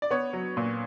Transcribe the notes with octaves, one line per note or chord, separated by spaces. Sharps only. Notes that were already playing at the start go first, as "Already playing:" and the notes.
D5
B3 C#5
F#3
A#2